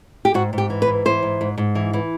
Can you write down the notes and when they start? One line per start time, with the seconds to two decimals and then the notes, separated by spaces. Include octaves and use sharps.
0.25 G4
0.34 G#2 F#4
0.53 G#2
0.58 G4
0.70 E3
0.82 B4
0.87 G#2
1.05 E3 C5
1.23 G#2
1.41 G#2
1.58 G#2
1.75 E3
1.93 E3